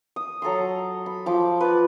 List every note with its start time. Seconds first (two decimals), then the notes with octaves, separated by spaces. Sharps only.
0.16 D#6
0.42 F#3 A4 A#5 C6
1.06 B5
1.26 F3 G5 D6
1.61 B4 D5